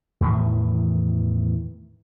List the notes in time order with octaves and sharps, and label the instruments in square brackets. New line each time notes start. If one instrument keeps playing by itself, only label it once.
[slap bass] E2 A2 D#3 E3